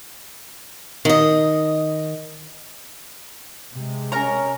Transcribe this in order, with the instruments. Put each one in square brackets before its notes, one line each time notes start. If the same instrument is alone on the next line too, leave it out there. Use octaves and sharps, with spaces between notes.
[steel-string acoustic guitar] D#3 D#5
[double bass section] C3 G#3
[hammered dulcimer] C#4 C#5 [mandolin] A#4 A#5